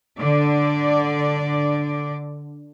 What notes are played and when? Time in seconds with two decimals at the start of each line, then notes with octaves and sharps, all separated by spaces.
0.19 D3 D5